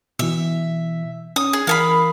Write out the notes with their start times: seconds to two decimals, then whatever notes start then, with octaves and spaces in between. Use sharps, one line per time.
0.19 B2 E3 E5
1.36 C#4 D#6
1.53 G#4
1.67 E3 A#4 F5 G#5 B5 D#6